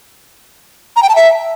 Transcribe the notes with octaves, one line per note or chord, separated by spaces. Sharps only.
A#5
G5
A5
E5